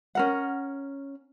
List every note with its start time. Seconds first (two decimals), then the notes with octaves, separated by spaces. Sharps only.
0.15 C#4 A#4 F#5